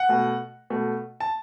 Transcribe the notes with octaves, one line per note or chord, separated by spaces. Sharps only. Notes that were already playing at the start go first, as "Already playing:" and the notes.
Already playing: F#5
B2 A3
B2 A3
A5